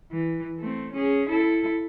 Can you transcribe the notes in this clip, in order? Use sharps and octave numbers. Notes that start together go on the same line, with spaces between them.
E3
A3 C4
C#4 G#4
E4 A4